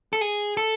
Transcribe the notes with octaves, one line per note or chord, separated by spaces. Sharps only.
A4
G#4
A4